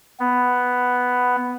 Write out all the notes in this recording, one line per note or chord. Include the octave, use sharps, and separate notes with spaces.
B3